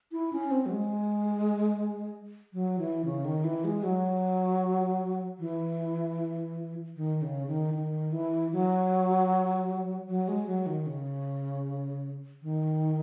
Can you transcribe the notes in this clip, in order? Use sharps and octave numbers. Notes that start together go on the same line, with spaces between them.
E4
C#4
C4
F#3
G#3
F#3
E3
C#3
D#3
E3
G#3
F#3
E3
D#3
C#3
D#3
D#3
E3
F#3
F#3
G#3
F#3
D#3
C#3
D#3